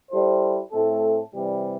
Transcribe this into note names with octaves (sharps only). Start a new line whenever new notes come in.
G3 E4 A4 C5
A2 A3 C4 A4
C3 E3 G3